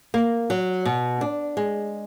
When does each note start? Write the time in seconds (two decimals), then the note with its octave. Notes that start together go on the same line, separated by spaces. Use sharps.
0.14 A#3
0.50 F#3
0.85 B2
1.21 D4
1.57 G#3